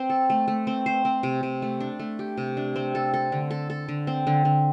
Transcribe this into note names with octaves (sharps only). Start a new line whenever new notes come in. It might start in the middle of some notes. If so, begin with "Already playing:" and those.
Already playing: C4 C5
A4
A3
A3
C4
C5
C4
C3
C3
A3
D4
A3
G4
C3
D4
C4
A4
A4
D3
A4
A4
D3
C4
D3
D3